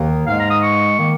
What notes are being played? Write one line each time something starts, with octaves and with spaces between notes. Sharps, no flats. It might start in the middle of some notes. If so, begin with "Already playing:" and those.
Already playing: D#2 D#3 A#3
G#2 G#3 F5
A#5
D#6
C#6
D#3 A#3